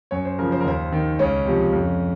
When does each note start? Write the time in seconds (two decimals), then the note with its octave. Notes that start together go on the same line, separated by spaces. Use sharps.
0.11 F#2 C#5
0.25 C5
0.38 C#3 F3 A#4
0.52 C5
0.61 A#4
0.65 D#2 C5
0.92 D#3
1.19 C#2 C#4
1.46 C3 F3
1.73 F2